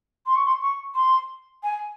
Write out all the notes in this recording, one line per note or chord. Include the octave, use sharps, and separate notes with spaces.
C6
C#6
C6
C#6
C6
G#5